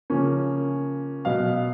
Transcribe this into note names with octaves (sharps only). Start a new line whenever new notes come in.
C#3 F3 A#3 C#4
B2 F#3 B3 F5